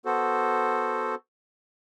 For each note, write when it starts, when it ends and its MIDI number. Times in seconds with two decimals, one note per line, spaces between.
0.05 1.15 59
0.05 1.15 66
0.05 1.15 69
0.05 1.15 72